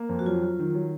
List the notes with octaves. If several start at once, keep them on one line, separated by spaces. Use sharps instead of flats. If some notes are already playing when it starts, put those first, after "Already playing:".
Already playing: A#3
F2
F#4
F#3 F4
F#3
D#3
F#3